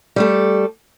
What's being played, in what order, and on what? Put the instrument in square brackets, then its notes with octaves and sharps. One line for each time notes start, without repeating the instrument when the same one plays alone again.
[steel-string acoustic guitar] G3 A3 A4